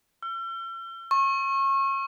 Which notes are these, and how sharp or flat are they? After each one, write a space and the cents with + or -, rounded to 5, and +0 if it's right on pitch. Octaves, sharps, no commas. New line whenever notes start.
E6 +45
C#6 -30